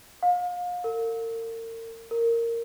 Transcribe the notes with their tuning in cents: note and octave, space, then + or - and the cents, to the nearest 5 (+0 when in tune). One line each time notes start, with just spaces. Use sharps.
F5 +35
A#4 -40
A#4 -10